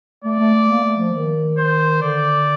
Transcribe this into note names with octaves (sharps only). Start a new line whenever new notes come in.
A3 D5
A3
A3
A#3
A3
F3
D#3
C5
D3 D5